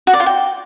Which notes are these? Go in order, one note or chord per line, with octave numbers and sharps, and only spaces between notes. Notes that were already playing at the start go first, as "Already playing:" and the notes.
F#4
D5
F4
G5